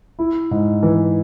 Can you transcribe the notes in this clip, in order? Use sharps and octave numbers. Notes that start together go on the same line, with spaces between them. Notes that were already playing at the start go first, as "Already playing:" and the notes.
E4
G#2
E3